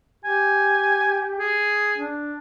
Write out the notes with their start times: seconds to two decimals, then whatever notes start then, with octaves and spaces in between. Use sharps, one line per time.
0.25 G4 G#5
1.39 G#4
1.98 D4